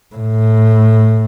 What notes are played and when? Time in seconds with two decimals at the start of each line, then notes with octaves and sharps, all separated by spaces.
0.15 A2